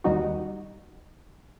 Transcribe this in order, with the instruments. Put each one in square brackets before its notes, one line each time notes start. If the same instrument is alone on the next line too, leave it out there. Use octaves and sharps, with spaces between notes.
[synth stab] D#2 D#3 G3 D#4 F#4